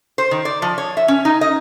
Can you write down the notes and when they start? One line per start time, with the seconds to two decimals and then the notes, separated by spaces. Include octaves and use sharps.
0.18 C5
0.31 D#3
0.45 D5
0.62 F3
0.78 C#5
0.97 E5
1.08 C#4
1.25 D#4
1.41 D#5